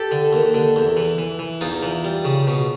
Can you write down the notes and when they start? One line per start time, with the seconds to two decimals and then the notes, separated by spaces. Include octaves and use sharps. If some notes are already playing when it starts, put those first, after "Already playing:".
Already playing: G4 A4
0.11 D3
0.33 D#2
0.54 D3
0.76 E2
0.97 E3
1.18 E3
1.39 E3
1.61 E2 D#4 F4
1.83 E3
2.04 G3
2.25 C#3
2.47 B2